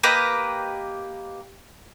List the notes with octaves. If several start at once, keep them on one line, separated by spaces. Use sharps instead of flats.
A#3 G4 B4 D#5